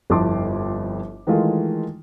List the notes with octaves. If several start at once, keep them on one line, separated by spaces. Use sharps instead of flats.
G1 F2 E4 A5 C6 D6
D#3 E3 G#3 A3 F4